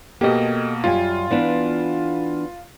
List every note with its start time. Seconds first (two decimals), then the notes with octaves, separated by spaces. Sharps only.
0.21 B2 A#3 G4 A4 D#5
0.84 F#2 G3 F4 G#5
1.31 E3 B3 D4